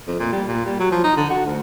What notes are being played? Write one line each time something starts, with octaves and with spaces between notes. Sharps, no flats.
F2
A#2
G3
A#2
G3
F#3
F3
D#4
D3
F#4
D2